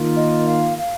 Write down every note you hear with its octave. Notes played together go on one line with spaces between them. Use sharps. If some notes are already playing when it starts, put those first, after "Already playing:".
Already playing: D#3 A#3 F4
D#5
F5
F5